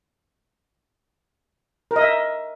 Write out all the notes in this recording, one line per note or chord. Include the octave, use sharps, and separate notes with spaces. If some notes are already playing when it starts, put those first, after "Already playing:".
A#4
D#5
E5